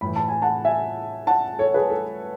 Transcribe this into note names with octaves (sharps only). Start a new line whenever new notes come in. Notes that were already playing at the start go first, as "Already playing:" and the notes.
A2 E3 B5
A5
G#5
F#5 A5
E5 G#5
F#5 A5
A4 C#5
G#4 B4
A4